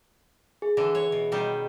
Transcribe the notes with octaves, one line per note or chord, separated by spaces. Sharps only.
G#4
D3 E3
C#5
B2
B2 D#3 G3